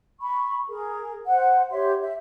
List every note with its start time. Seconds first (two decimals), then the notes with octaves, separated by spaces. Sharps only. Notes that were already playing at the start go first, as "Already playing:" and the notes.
0.21 B5 C#6
0.70 G#4 A#4
1.27 C5 F#5
1.71 G4 C#5 E5 C6
2.02 E5